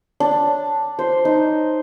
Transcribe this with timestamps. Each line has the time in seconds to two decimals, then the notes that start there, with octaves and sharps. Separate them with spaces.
0.20 D4
0.99 C5
1.25 D#4